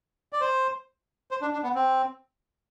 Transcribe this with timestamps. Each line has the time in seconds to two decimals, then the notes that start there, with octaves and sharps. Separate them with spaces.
0.33 D5
0.41 C5
1.31 C5
1.41 D4
1.53 D4
1.63 B3
1.75 C4